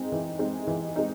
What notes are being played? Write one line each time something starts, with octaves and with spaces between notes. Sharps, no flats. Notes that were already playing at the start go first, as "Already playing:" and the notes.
Already playing: G#3 C4 D#4
E3
G#3 C4 D#4
E3
G#3 C4 D#4